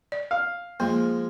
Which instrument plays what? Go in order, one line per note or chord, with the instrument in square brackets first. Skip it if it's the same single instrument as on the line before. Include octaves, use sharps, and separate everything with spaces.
[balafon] D5
[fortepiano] F5
[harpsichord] F3 G#3 [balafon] A#3